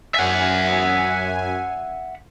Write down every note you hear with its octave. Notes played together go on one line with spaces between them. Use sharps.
F#2 E5 F#5 G#5